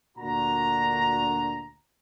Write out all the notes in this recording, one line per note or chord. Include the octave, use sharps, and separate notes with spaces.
D2 A#2 D4 F#4 A#5